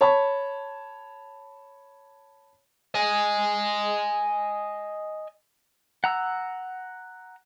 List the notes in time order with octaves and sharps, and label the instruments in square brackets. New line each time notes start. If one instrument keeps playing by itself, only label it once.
[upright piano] C#5 A5 B5
[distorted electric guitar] D#5 G#5
[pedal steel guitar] F#5 A#5 E6